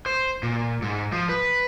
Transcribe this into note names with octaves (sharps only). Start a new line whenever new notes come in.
C5
A#2
G#2
F3
B4